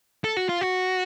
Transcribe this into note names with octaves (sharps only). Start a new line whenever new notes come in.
A4
F#4
F4
F#4